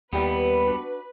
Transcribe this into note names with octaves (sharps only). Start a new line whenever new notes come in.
D#2 G3 B3 E4 G4 B4 D5
D4 F#4